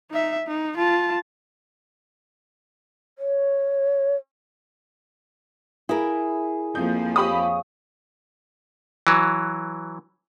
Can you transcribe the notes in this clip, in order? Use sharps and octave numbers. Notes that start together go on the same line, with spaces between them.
D#4 E5
D#4
F4 A5
C#5
E4 G#4 A#4 B5
F2 F3 A#3 D#5 G6
G4 C#5 F5 B5 D#6
E3 F#3